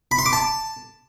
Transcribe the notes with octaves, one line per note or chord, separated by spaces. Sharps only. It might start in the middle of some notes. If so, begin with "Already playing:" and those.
B5
C6
D6
A5